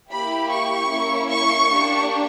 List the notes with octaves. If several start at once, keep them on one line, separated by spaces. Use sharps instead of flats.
A#3 E4 G4 B5
C#6
A#3 C#4 E4
C#6
A#3 D4 G4